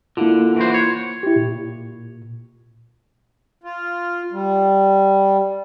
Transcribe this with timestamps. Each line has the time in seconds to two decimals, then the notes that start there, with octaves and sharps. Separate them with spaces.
0.17 D3 A#3 E4 F4
0.56 E3 F#4 C5
0.74 C#5
1.23 E4 G4
1.36 A#2
3.64 F4
4.32 G3